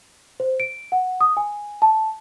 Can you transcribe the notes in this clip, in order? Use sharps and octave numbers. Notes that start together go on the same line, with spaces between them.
C5
D7
F#5
D#6
G#5
A5